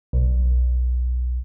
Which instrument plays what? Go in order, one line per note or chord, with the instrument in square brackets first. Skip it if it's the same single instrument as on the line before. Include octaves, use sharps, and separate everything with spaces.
[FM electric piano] B1